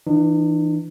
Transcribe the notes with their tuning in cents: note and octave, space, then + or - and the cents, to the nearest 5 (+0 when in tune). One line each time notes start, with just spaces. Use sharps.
E3 +0 D4 +45